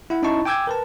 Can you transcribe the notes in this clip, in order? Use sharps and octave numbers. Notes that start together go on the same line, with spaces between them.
E4 F#5
C#4 D#4 E4 D#5 A5 C#6
G5 G#5 D6 E6 G6 G#6
A#4 B4 A5